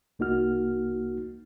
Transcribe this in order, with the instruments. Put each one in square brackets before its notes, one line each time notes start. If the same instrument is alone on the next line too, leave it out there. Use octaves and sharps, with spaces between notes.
[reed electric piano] C2 A#3 D#4 F#4 F6